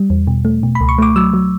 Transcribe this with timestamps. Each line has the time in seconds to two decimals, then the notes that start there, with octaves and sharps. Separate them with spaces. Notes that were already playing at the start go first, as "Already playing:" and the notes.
Already playing: G3
0.10 E2
0.27 B2
0.45 A3
0.63 B2
0.75 B5
0.81 C#2
0.89 C#6
0.98 A3 D6
1.16 F#3 E6
1.33 F#3